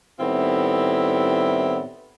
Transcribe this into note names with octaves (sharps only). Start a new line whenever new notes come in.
A2 D#3 G3 B3 C4 E4